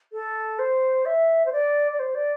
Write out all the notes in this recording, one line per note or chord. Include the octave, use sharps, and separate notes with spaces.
A4
C5
E5
C5
D5
D5
C5
D5